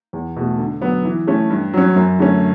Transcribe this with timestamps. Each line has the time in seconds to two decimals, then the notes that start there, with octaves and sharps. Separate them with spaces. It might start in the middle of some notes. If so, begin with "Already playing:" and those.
0.13 E2
0.36 B2 A3
0.59 D3
0.82 F#3 B3
1.05 E3
1.27 A3 C#4 E4
1.50 G2
1.73 F#3 C#4
1.96 F#2
2.19 D3 A3 C#4